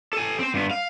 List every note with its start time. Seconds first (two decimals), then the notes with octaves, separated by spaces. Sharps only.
0.13 A4 G#5
0.39 C4 C5
0.54 G2 B3
0.71 F5